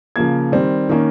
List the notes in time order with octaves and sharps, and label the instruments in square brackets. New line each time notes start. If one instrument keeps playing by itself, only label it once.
[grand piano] C#3 F3 A#3 G#6
D#3 G3 C4
D#3 A#3 C#4